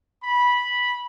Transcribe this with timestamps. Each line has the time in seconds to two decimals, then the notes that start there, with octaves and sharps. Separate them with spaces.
0.23 B5